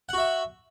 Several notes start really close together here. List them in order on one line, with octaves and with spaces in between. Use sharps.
F#5 F#4 E5